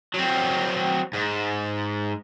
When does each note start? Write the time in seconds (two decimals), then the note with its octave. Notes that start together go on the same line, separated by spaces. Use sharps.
0.14 F#3 C4
1.14 G#2